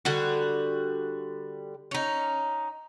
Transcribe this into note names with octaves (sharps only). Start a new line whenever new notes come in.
D3 G3 F#4
C#4 D#4